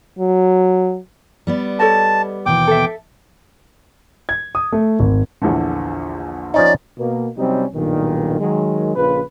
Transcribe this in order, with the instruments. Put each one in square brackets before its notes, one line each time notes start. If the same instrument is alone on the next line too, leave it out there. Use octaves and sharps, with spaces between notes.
[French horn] F#3
[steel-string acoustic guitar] G3 B3 D5
[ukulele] A4 C#5 D#5 [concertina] A5
[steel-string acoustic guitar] D#2 B2 E3 [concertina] G5 D6
[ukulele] A4 E5
[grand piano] G#6
D#6
A3
G#1
[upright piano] A#1 E2 D3
[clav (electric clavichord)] F3 C#4 D#4 [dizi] D5
[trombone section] B2 A#3
C3 F#3 G3 C4 C#4 D#4
B1 G2 A#2 D#3
D#3 F#3 G#3
A#1 C#3 F4 B4